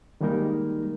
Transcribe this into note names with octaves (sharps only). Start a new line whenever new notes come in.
D#3 G3 G#3 A#3 D#4 A#4